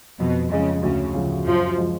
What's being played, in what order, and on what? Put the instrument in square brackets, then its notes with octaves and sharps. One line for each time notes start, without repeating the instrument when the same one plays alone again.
[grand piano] F2 [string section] B2
[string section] C#3 [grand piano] F3 G#3
[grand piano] D2 [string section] C#3
[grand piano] C#3 F3
[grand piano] F#2 [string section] F3
[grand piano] F3 G#3